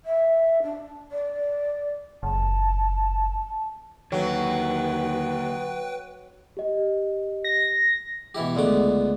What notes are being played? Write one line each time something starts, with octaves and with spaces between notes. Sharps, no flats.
E5
D4
D5
F#1 A5
D#2 D3 F#3 A#3 B4 G5
G4 D#5
A#6
B2 E3 E4 G4
C#2 D3 A3 B3 D6